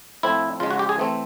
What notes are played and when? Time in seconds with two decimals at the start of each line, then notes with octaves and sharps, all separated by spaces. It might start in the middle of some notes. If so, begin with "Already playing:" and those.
0.23 A2 F3 A3 C4 E4
0.60 C#3 F3 G#3 F4
0.71 F#4
0.79 G4
0.89 G#4
0.98 E3 A3 C4